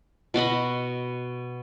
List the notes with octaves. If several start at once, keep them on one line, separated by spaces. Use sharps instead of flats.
B2 F#4 D#5 B5